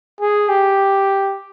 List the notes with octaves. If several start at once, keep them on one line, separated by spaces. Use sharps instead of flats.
G#4
G4